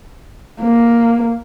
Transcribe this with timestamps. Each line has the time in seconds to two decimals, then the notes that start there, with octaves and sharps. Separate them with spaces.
0.62 A#3